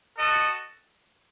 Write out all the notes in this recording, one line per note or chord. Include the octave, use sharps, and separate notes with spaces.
F#4 A4 D#5